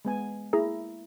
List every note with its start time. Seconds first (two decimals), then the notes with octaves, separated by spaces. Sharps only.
0.05 G#3 B3 G#5
0.53 A#3 E4 G#4 A#5